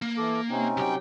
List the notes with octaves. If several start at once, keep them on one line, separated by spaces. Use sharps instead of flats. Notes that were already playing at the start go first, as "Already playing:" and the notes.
A#3
E3 A4 D6
C3 C4 C#4 D#4
C2 F#3 G4 G5